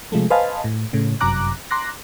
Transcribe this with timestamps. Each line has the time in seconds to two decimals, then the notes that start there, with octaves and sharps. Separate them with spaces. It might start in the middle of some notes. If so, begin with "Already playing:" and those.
0.12 C3 F3 G#3 A3
0.30 B4 C5 D#5 F5 G#5 A5
0.64 A2
0.93 A2 C#3
1.21 G1 F#2 C3 A#5 D6 F#6
1.71 A#5 C6 D6 F#6 A#6